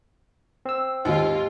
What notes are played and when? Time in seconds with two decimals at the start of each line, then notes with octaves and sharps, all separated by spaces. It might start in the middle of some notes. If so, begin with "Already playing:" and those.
0.65 C4 E6
1.05 D#2 G#2 F4 G4